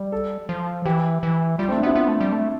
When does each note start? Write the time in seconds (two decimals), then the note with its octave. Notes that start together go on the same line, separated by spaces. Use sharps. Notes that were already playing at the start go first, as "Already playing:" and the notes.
Already playing: G3
0.12 A4
0.49 F3
0.85 E3 G4
1.23 E3
1.58 G3 F4
1.68 C4
1.71 A3
1.77 D4
1.83 B3 E4
1.95 B3 F4
2.08 A3
2.20 G3
2.32 A3